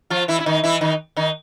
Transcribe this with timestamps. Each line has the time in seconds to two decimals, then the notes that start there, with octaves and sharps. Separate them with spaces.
0.10 F3 F4
0.28 E3 E4
0.40 E4
0.46 D#3 D#4
0.64 E3 E4
0.81 D#3 D#4
1.17 D#3 D#4